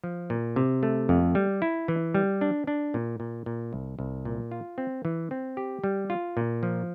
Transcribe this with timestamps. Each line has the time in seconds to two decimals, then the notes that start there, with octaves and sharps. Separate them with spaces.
0.04 F3
0.30 A#2
0.56 C3
0.83 A3
1.09 F2
1.35 G3
1.62 E4
1.88 E3
2.14 G3
2.41 D4
2.67 D4
2.94 A#2
3.20 A#2
3.46 A#2
3.73 C2
3.99 C2
4.25 A#2
4.51 F4
4.78 C4
5.05 E3
5.31 C4
5.57 G4
5.84 G3
6.10 F4
6.37 A#2
6.63 F3